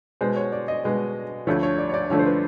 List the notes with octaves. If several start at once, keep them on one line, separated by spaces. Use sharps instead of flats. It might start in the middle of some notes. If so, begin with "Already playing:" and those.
B2 G#3 B3 C5
C#5
D5
D#5
B2 G#3 B3
D2 D3 F3 A3 C#5
C#5
D5
C#5
D5
D2 D3 F3 A3 C#5
C5
B4